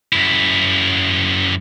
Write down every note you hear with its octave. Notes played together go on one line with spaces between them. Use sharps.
F#2 E4